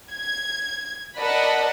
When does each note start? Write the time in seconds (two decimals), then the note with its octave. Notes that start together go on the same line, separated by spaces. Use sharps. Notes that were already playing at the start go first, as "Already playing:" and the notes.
0.11 G#6
1.19 A#4 D5 D#5 F#5 A5 B5